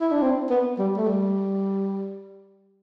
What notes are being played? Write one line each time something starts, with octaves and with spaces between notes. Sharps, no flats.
E4
D4
C4
B3
G3
A3
G3